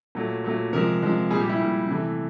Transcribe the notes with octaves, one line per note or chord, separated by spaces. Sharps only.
A#2 F#3 A3
A#2 F#3 A3
C3 F3 G#3 A#4
C3 F3 G#3
A#2 G3 G#4
G4
E4
A#2 G3
C3 E3 A3